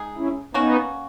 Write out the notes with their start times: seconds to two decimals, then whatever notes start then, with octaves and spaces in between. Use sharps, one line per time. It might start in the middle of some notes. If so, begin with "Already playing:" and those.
Already playing: G#3 D#4 G#4
0.17 C#4 E4
0.54 A#3 B3 C#4 D#4 F#4